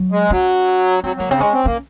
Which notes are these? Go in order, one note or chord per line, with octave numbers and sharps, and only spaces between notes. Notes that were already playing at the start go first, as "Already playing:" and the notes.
Already playing: F#3
G#3
F#3 C#4
F#3 C4
F#3 A#3
C#3 C4
G#3 C#4
C4
A#3 C#4